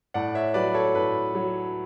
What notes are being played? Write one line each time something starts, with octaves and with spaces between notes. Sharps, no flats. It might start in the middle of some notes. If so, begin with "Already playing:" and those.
A2 D5 F#5
C#5 E5
F#3 B4 D5
A4 C#5
A2 B4
F#3